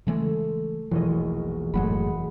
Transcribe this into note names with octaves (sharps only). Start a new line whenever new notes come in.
C#3 E3 G#3 A3
E1 A#1 E3 D#5
F#1 F#2 A2 G#3 F#5 B5